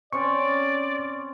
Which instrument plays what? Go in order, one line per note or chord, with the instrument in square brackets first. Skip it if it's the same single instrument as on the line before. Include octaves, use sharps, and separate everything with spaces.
[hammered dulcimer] C4 C#4 [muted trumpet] D5 [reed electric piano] C#6